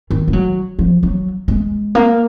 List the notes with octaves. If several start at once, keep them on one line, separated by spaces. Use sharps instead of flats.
D#3
G#3
F#3
F3
F#3
G#3
A#3